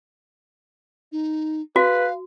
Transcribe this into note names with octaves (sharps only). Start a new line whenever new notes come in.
D#4
F#4 B4 F5